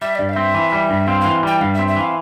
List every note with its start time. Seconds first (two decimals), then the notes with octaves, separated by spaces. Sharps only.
0.01 G3 E5
0.15 G2 D5
0.29 F5
0.33 C4 E5
0.54 E3
0.72 G3
0.90 G2
1.07 C4 F5
1.21 E3 F5
1.43 G3 G5
1.61 G2 F5
1.74 E5
1.79 C4
1.88 E5
1.96 E3 F5